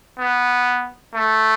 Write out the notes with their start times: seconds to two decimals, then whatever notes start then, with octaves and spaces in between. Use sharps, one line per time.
0.19 B3
1.15 A3